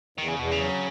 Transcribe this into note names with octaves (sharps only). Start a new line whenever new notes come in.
E2 D#3
C#3
E2 B2
C#3
F#3